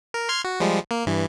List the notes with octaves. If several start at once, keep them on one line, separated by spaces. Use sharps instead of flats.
A#4
C6 F6 G#6
F#4
F3 G3 G#3
A#3
G2 E3